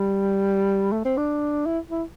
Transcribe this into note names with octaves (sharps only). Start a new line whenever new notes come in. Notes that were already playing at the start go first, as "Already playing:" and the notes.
Already playing: G3
A3
C4
D4
E4
E4